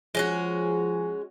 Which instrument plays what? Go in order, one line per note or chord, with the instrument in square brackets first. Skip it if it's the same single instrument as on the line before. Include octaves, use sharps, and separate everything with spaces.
[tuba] F3 [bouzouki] G#3 C#4 F#4